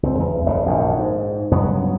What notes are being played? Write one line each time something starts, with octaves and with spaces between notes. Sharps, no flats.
C#2 C4
E2
F1 C#3
A#1 F#2 C3 D#3
G#2
G2 C#3 F#3 B3